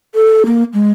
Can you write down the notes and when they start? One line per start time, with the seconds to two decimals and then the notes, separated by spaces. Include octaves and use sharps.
0.15 A4
0.46 A#3
0.74 G#3